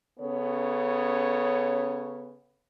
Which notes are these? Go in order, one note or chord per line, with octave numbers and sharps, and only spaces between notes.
C#3 B3 C#4 A4 C#5